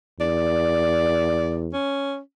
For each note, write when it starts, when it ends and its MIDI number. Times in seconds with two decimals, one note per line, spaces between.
0.20 1.72 40
0.20 1.59 74
1.73 2.19 61